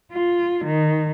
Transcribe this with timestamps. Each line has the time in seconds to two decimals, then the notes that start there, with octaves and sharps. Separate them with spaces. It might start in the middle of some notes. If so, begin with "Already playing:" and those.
0.14 F4
0.64 D#3